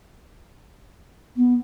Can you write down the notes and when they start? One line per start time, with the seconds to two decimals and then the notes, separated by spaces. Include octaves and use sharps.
1.36 B3